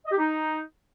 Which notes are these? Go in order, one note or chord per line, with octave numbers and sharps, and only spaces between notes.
D#5
G4
D#4